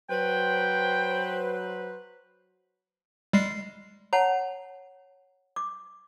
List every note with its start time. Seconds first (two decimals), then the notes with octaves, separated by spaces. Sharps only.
0.11 F#3 B4 C5 G5
3.33 G3 G#3 C7
4.13 C#5 F#5 A5 A#5
5.56 D6